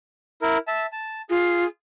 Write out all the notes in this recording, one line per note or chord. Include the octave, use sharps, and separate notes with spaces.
E4 A#4
E5 A5
A5
F4 G#4